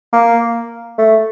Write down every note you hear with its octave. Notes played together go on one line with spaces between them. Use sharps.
A#3
A3